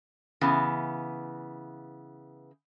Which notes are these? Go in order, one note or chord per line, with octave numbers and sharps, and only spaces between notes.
C#3 E3 B3